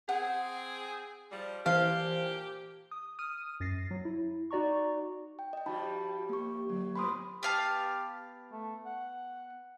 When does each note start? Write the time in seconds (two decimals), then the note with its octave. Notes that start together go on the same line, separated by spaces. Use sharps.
0.09 C4 G#4 F#5
1.32 F3 G3
1.66 A#2 E3 G4 C5 F5 A5
2.91 D#6
3.19 D#6 F6 D#7
3.60 F#2 A6 A#6 C7
3.91 F#3
4.05 E4
4.51 D#4 F#4 D5 A#5 C#6
5.39 G5
5.53 D#5 G5
5.66 G2 F3 G3 D#4 F#4 A5 B5
6.29 A#3 G4 C#6
6.69 D3 F#3
6.96 G#2 B3 A#4 B5 C6 D#6
7.43 B3 G4 F5 A5
8.52 A3
8.86 F#5